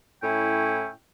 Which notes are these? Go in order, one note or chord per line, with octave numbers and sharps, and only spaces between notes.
A2 C#4 E4 G5